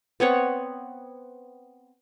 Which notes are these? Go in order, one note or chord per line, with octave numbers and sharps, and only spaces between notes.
B3 C4 C#5 F#5